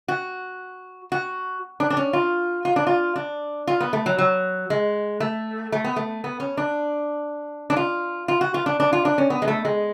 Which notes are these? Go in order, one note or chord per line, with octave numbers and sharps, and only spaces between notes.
F#4
F#4
D4
D4
C#4
F4
F4
D4
F4
D4
F4
B3
A3
F#3
F#3
G#3
A3
A3
B3
A3
B3
C#4
D4
D4
F4
F4
F#4
F4
D4
D4
F4
D4
C#4
B3
G#3
A3
G#3